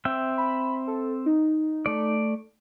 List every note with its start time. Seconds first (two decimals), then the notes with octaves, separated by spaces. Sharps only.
0.05 C4 E5 G5
0.38 B5
0.87 A4
1.26 D#4
1.86 A3 D5